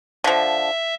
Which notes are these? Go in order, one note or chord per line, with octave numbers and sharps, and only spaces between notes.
D3 F3 E5